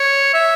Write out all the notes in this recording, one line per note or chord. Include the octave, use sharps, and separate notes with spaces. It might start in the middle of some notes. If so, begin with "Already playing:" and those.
Already playing: C#5
E5